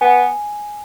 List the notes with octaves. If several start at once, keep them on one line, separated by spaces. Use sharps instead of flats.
B3 G#5